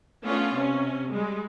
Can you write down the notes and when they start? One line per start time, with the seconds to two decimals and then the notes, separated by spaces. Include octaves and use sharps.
0.25 A3 B3 C#4 D4 F4
0.55 C3 C#4
1.13 G3 G#3